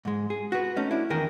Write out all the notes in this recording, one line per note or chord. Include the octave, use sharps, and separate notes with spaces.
G#2 G#3
G#4
F#4 B4
A3 C#4 D#4
D4 E4
E2 D#3 A#4 G#5